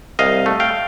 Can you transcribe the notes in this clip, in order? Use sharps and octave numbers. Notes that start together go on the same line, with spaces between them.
C2 D#5 F5
A3
F5 G5